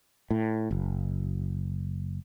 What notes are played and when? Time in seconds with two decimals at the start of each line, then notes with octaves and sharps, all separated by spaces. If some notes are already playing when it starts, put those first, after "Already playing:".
0.31 A2
0.71 F#1